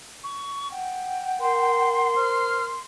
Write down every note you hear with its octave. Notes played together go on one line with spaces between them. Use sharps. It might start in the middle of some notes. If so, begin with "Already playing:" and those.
C#6
F#5 G5
A#4 C6
C5 F6